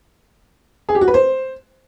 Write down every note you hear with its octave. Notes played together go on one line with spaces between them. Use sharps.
G#4
G4
F#4
B4
C5